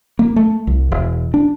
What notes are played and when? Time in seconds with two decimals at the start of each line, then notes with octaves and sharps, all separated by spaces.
0.19 A#3
0.36 A3
0.67 C2
0.92 E1
1.34 D4